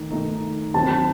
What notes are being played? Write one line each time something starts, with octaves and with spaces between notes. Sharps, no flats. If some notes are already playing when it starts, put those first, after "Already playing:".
Already playing: D#3 A3 D#4
D#3 A3 D#4
D#2 D#3 F#3 C4 F#4 A5